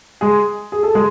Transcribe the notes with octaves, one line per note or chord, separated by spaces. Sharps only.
G#3 G#4
G#4
A4
G#3 G#4